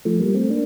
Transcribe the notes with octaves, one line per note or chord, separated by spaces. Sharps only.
F3 A3
G3 A#3
A3 C4
A#3 D4